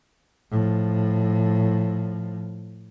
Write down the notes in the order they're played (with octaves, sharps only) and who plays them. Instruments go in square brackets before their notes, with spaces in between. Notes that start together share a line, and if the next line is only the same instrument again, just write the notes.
[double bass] A2 F3